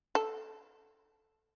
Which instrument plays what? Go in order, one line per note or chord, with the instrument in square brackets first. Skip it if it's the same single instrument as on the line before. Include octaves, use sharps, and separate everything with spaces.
[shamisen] A4